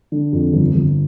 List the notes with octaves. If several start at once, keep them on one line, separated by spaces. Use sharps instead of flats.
D3
F2
G1
G1